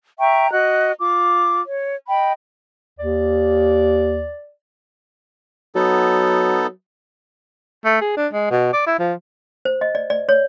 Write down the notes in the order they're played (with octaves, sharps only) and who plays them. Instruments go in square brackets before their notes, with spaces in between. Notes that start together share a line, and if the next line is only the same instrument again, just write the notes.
[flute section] E5 G5 A#5 C#6
F#4 D#5 F#6
F4 D6
C#5
D#5 G5 B5
[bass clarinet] D#2 [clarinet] D5
[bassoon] F#3 [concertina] B3 D#4 A4
[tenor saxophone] A3
G#4
D4
G#3
B2
D5
E4
F3
[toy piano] C5
D#5
D5
D5
C#5